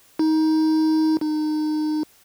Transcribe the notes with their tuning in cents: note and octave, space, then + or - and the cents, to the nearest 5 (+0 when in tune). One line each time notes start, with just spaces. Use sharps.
D#4 +20
D#4 -25